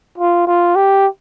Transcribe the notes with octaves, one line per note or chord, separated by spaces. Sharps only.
F4
F4
G4